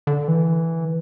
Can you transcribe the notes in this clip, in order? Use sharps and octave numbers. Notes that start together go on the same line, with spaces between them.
D3
E3